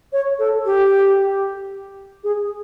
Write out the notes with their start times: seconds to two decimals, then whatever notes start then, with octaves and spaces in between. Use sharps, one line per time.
0.13 C#5
0.39 A4
0.65 G4
2.24 G#4